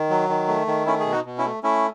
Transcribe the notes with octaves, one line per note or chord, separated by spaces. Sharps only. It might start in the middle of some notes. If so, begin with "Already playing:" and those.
Already playing: D#3
F#3
D#3
A3
D#3
A3 C#4 E4
G#4
B2
D#4 F#4
B2
C#4 E4
A3
A3 C#4 E4